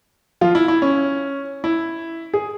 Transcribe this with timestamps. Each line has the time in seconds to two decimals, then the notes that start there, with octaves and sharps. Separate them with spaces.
0.41 F3 F4
0.55 E4
0.68 E4
0.82 C#4
1.64 E4
2.34 G#4